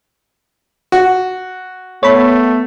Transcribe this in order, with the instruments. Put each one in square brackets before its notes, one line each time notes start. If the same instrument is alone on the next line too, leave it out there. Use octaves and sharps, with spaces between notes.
[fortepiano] F#4
[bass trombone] A3 [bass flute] B3 [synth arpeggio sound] C#5 B5